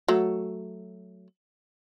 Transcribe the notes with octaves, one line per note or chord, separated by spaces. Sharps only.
F#3 A3